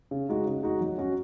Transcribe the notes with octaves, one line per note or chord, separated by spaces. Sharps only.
C#3
G#3 D#4 F#4
C#3
G#3 D#4 F#4
F#3
C#4 F#4